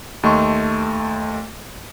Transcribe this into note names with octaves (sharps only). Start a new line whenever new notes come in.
D#2 A3 D#5 C6 C#6